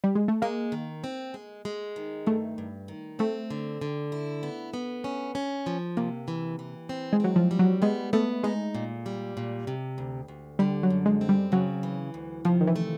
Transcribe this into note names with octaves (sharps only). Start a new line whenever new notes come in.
G3
G#3
A3
G#3 A#3
D#3
C4
G#3
G#3
D#3
G2 A3
G2
D#3
A3 C4
D3
D3
E4
B3
B3
C#4
C#4
F3
C3 A#3
E3
E3
C4
G#3
F#3 C4
F3
G3
F#3
G#3 B3
A3 B3
G#3 D#4
A#2
G3
A#2
C3
D2
D2
D3 G3
F#3
F#2
G#3
C4
G3
C#3 F#3
E3
D2
C3 F3
D#3
E3
A3